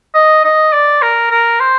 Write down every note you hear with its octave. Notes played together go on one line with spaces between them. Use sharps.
D#5
D#5
D5
A#4
A#4
C5